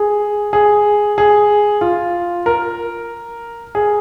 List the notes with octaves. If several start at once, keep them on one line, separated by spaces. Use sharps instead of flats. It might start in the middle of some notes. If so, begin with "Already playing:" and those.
Already playing: G#4
G#4
G#4
F4
A#4
G#4